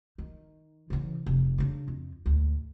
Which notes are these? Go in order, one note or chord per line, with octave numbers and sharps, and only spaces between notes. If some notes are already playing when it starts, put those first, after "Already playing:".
D#3
C#3 E3
F1
C#3 D4
F2
D2 G#2